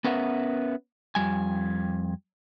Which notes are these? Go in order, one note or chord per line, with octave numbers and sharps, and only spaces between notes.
B3 C#4 A#4 B4 E5 F#5
F2 G3 G#5